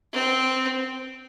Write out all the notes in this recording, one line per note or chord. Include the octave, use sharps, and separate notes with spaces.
C4